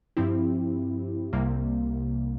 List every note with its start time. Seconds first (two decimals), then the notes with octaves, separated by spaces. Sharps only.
0.17 G2 F3 C4 E4 G4
1.32 C2 C3 G3 A#3